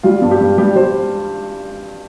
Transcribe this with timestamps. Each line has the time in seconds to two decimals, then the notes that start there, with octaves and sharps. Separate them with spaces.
0.03 G3 F4
0.22 G2
0.31 G4
0.40 G2
0.58 G3 G4
0.75 G3 C5